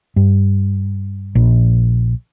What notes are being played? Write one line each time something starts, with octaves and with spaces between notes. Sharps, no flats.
G2
A#1